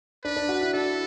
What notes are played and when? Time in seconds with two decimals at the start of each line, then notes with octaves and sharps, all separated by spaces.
0.24 D4 B4
0.36 D4
0.49 F#4
0.61 E4
0.74 D4 A4